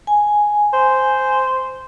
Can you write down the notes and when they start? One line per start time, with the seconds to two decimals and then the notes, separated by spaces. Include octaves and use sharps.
0.07 G#5
0.73 C5